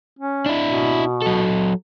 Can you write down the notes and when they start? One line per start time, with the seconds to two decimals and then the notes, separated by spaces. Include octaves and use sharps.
0.19 C#4
0.46 D4 E4
0.64 B2
1.22 F#3 A4